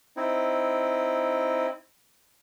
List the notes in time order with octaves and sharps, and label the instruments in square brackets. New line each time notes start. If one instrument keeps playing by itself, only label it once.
[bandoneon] C4 D#4 E4